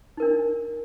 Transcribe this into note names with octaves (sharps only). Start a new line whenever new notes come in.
D4 D#4 A#4